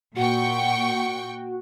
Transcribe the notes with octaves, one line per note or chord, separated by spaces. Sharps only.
A#2 F#4 F#5 G5 C#6